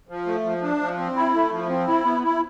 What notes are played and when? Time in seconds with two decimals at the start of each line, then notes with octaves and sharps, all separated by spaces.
0.09 F3
0.26 A3
0.44 F3
0.62 D4
0.80 F3
0.98 C4
1.16 E4
1.34 A3
1.51 F3
1.69 C4
1.87 E4
2.05 B3
2.23 E4